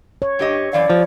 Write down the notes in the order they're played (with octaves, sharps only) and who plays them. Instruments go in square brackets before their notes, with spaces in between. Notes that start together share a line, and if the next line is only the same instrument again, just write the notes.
[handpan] C#5
[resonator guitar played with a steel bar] G2 G4 D#5
[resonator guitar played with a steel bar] F#2 E3 F5 [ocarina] D5
[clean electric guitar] F3 [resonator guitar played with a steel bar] G3